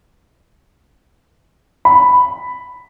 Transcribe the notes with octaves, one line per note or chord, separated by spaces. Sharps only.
B5